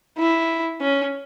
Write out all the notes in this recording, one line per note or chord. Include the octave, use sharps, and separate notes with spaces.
E4
C#4